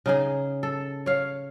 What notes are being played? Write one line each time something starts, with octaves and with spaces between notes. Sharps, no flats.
C#3 D#4 G#4
A4
C#5 F5